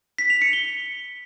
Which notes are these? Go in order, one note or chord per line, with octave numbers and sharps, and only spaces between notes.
B6
F7
C#7
G7